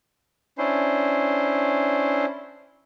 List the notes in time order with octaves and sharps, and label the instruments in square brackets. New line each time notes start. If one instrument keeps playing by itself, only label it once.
[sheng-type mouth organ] C#4 D4 E4 C5